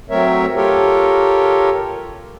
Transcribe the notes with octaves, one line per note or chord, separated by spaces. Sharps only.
F#3 A3 C4 A#4 C#5 E5
F4 G4 A4 A#4 C#5